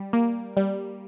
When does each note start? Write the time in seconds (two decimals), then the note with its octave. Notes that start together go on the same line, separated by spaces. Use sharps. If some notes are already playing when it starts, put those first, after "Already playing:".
Already playing: G3
0.13 A#3
0.57 G3